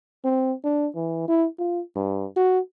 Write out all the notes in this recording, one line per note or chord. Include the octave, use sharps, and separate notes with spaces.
C4
D4
E3
E4
F4
G2
F#4